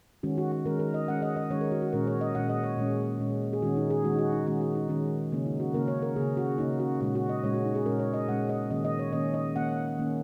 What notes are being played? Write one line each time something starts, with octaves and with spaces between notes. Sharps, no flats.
D#3 G#3 C#4 F#4
F#4
F#4
D#3 G#3 C#4 A#4
A#4
D#5
D#3 G#3 C#4 F#5
D#5
D#5
D#3 G#3 C#4 C#5
A#4
F#4
F#4
A#2 G#3 C#4 A#4
C#5
D#5
A#2 G#3 C#4 F#5
D#5
C#5
A#2 G#3 C#4
A#2 G#3 C#4
G#4
D#3 G#3 C#4 F#4
D#4
G#4
D#3 G#3 C#4 F#4
D#4
F#4
D#4
D#3 G#3 C#4 F#4
F#4
D#4
D#3 G#3 C#4
C#3 A#3 C#4
D#4
F#4
C#3 A#3 C#4 A#4
C#5
A#4
C#3 A#3 C#4 G#4
F#4
C#3 A#3 C#4 D#4
F#4
A#2 G#3 C#4 F#4
F#4
D#5
A#2 G#3 C#4 C#5
F#4
D#4
G#4
A#2 G#3 C#4 A#4
C#5
D#5
A#2 G#3 C#4 F#5
D#5
D#3 A#3 C#4 D#5
D#5
C#5
D#3 A#3 C#4 D#5
D#5
D#3 A#3 C#4 F#5
D#3 A#3 C#4